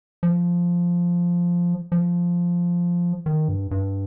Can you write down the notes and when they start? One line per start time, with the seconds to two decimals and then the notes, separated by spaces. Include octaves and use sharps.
0.23 F3
1.92 F3
3.26 D#3
3.48 G2
3.71 G2